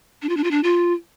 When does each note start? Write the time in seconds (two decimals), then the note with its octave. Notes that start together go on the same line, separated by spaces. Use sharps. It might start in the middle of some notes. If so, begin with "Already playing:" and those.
0.22 D4
0.29 F4
0.37 D4
0.44 F4
0.51 D4
0.63 F4